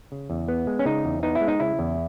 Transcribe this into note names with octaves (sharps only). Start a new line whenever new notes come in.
C#3
E2
B3
G#3
C#4
C#3 D#4
E2
B3 D#4
E4
G#3
D#4
C#3 E4
E2